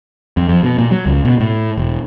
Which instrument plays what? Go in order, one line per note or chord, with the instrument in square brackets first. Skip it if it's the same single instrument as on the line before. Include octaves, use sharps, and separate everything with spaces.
[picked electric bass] F2
F2
B2
A#2
F#3
C#2
B2
A2
E1